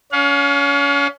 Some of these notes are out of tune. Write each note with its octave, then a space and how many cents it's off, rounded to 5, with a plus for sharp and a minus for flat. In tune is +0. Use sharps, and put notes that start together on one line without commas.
C#4 +30 F5 +35